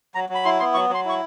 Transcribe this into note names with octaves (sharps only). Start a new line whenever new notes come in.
F#3 A#5
F#3
B5
E4 C6
B3 C6
F#3 C#6
F#3 C6
E4 C#6